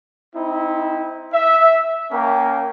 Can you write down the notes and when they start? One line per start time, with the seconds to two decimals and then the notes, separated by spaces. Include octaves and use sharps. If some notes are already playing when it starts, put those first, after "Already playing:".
0.35 C4 D#4 E4
1.33 E5
2.11 A#3 C#4 A#4 G5